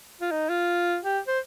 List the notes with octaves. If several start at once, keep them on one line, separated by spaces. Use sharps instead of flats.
F4
D#4
F4
G4
C5